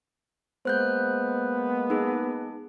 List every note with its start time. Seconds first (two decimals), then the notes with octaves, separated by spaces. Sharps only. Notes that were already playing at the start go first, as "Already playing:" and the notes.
0.65 G#3 A#3 B3 C5 F#6 G6
1.90 D#4 G#4